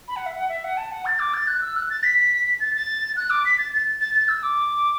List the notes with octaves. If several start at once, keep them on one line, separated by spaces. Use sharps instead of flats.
B5
F#5
E5
F#5
E5
F#5
A5
F#5
A6
D6
A6
F#6
E6
F#6
A6
B6
A6
A6
F#6
D6
B6
A6
A6
A6
A6
E6
D6